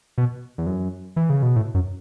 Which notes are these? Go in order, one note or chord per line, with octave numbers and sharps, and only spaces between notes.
B2
E2
F#2
E3
C#3
B2
A2
F#2